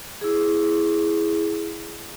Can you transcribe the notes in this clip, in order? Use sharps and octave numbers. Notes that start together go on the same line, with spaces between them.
E4 G#4